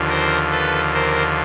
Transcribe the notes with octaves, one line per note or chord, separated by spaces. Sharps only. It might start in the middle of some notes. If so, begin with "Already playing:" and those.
Already playing: D#2 D3 F3
A#4 C5
A4 B4
A#4 C5